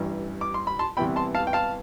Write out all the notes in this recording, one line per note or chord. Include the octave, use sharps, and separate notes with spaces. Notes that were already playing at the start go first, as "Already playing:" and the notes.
Already playing: A1 G2 E3
D6
C6
B5
A5 C6
C2 C3 E3 B3 G5 B5
A5 C6
F5 A5
G5
F5 A5